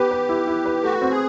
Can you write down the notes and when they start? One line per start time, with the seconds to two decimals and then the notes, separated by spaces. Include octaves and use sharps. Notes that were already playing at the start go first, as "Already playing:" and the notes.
Already playing: B3 G4 B4
0.11 B4
0.29 E4
0.47 E4
0.65 B4
0.83 A3 F#4
1.02 C4
1.11 G#4